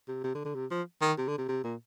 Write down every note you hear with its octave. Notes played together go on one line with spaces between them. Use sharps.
C3
C3
D3
D3
C3
F3
D#3
C3
D3
C3
C3
A#2